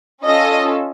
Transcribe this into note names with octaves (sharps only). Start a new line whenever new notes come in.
C#4 F4 A4 D#5